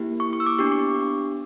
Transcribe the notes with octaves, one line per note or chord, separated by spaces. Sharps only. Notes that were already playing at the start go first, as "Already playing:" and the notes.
Already playing: A#3 E4 G4
C#6
C#6
E6
D6
B3 D4 G4 C#6
C#6